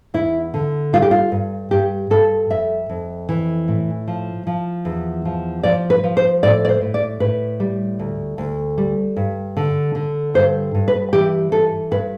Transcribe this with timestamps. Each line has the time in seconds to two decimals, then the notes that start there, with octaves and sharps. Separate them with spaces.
0.14 E2 E4
0.54 D3
0.93 G3 F4
1.02 G4
1.11 F4
1.32 G2
1.71 G2 G4
2.10 G2 A4
2.50 F2 E5
2.89 F2
3.29 E3
3.68 A2
4.08 F3
4.47 F3
4.85 E2
5.25 F3
5.63 F3 D5
5.90 B4
6.04 F3
6.17 C5
6.43 A2 D5
6.65 D5
6.69 C5
6.81 A2
6.94 D5
7.20 A2 B4
7.60 G3
7.99 D2
8.38 D2
8.78 G3
9.16 G2
9.57 D3
9.95 D3
10.34 G2 C5
10.75 G2
10.88 B4
11.13 E3 G4
11.52 E3 A4
11.91 G2 B4